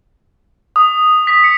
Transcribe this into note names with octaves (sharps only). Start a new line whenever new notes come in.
D#6
B6
C#7